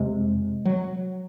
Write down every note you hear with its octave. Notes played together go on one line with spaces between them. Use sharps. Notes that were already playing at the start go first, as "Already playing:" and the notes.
Already playing: F2 C3 G#3
F#3